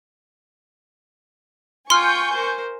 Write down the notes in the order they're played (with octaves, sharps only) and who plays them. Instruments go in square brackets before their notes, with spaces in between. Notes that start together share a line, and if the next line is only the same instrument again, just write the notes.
[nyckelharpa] F4 G5 [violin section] G#5 C#6 G6 [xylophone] C6 F6
[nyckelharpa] A#4 C5